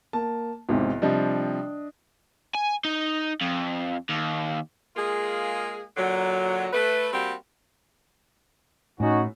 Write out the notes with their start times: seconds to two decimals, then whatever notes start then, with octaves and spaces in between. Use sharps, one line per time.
0.13 A#3 A5
0.69 B1 E2 G#2 C3
1.02 C3 F3 G3 D4 D#5
2.55 G#5
2.85 D#4
3.41 F2
4.09 D#2
4.96 G#3 A#3 F4 G#4
5.97 A#2 D3 F#3
6.73 A3 B4
7.12 G3 A#3 C4 F#4 G4
9.00 A2 C#4 D#4 F#4